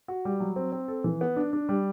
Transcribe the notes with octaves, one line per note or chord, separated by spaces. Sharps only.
F#4
G3
F#3
C4
C4
A4
E3
B3
D4
D4
G3